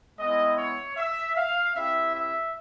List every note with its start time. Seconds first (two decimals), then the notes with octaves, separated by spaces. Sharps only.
0.19 G#3 B3 E4 D#5
0.58 C#5
0.97 E5
1.37 F5
1.76 C4 E4 G4 E5
2.15 E5